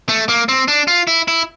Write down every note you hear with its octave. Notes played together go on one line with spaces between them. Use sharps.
A3
A#3
C4
D4
F4
E4
E4